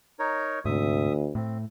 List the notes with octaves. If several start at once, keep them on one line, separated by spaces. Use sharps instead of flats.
D#4 A#4 C#5
D2 G#2 C3 E5 D#6
A2 C4